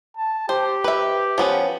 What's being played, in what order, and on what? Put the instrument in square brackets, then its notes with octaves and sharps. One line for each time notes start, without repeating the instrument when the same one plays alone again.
[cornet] A5
[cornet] G4 [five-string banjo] C5
[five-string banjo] B4 E5
F3 B3 C#4